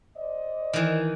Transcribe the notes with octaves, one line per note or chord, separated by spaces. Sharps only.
C5 D5 D#5
D#3 E3